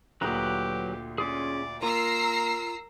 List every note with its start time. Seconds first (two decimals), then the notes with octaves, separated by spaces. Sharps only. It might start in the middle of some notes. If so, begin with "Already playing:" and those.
0.21 D2 A#2 F#3 G4 B4 A#5 D#6
1.18 C#4 F4 G#4 D5
1.82 A#3 F4 A#4 A#5 E6 C7